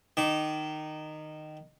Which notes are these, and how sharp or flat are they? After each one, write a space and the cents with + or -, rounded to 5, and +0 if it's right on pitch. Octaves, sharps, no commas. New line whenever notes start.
D#3 -15 D6 +0